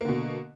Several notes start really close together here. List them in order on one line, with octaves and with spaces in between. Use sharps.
A#3 D3 B2